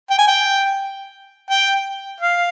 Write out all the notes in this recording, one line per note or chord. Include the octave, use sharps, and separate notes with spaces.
G5
G#5
G5
G5
F5